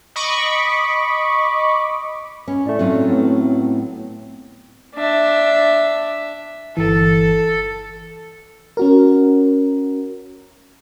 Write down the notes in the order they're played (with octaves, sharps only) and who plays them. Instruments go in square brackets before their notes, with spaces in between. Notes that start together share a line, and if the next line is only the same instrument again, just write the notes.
[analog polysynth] D#5 B5 C#6 D6
[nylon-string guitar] C#4
[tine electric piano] A2 A3 [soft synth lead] D5
[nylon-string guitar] F#3 C#4 F4 [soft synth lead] C4
[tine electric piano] A2 B3
[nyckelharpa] D4 E5
[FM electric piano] G1 E3 [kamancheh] A4
[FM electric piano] C#4 F#4 A#4